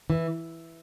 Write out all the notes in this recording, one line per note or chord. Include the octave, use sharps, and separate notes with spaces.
E3